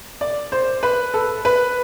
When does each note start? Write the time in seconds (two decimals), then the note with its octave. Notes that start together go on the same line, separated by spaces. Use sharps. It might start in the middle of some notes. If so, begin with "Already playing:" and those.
0.21 D5
0.52 C5
0.83 B4
1.14 A4
1.45 B4